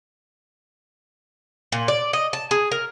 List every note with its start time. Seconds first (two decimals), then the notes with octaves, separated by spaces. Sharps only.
1.72 A#2
1.88 D5
2.13 D#5
2.33 A5
2.51 G#4
2.71 A#4